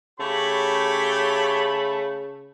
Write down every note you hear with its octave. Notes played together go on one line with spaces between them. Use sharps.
C#3 A3 G4 C#5 B5